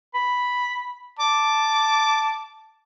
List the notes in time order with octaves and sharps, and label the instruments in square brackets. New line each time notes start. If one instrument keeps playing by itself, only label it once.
[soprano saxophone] B5
[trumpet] A5 [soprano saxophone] D6